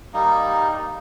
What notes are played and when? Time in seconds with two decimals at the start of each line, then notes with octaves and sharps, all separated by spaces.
0.14 G3 A#3 D#4